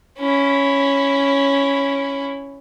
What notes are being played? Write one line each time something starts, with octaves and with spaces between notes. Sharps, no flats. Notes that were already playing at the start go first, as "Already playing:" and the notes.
C#4 E4